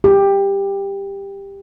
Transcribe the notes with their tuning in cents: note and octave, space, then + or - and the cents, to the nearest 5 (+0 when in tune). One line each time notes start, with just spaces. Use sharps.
G4 +15